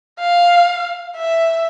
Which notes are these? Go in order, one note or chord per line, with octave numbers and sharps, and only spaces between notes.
F5
E5